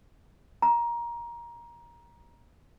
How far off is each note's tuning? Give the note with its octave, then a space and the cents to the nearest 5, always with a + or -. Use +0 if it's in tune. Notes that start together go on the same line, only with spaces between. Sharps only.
A#5 +20